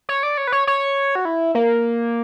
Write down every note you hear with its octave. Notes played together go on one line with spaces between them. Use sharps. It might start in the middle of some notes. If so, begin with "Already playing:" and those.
C#5
D5
C#5
B4
C#5
C#5
F#4
E4
A#3